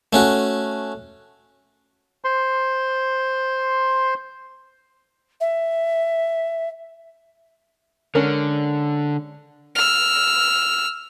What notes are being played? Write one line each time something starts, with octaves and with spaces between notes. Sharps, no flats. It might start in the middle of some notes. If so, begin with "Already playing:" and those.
A3 C#4 F#4
C5 C6
E5
D3 G#3 C#4 A#4
E6 F6